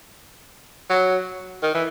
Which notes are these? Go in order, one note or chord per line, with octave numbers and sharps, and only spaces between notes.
F#3
D#3
E3